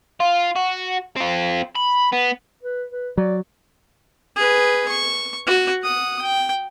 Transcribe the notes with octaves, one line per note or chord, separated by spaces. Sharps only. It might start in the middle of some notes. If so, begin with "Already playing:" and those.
F4
F#4
C4 F4
B5
B3
B4
B4
F#3 D5
G#4 B4
C#6
F#4
F#5 D#6
G5